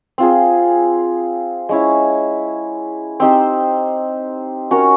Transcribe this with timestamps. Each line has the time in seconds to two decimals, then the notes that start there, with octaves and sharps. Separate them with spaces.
0.18 C4 F4 G#4
1.69 G#3 C#4 E4
3.20 C4 D#4 G4 C5
4.71 C#4 F#4 A#4 C#5